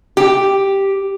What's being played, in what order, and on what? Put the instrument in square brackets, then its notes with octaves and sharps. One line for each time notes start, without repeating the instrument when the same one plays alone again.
[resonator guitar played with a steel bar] G4